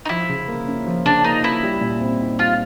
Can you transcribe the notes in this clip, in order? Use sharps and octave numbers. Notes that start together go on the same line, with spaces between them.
D#4
F3 E4
C#3
A#3
C#4
F3
C#3 D4
A#3 D#4
C#4 E4
G3
A#2
C4
D#4
G3 F4